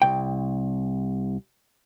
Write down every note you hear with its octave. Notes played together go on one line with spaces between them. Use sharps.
C2 G5